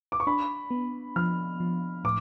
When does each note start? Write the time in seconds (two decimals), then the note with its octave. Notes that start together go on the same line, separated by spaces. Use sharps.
0.12 D6
0.20 C#6
0.27 D4 B5
0.71 B3
1.16 F3 F6
1.60 F3
2.04 A2 D6